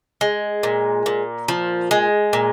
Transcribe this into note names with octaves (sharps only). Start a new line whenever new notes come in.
G#3
A#2
A#2
F3
G#3
A#2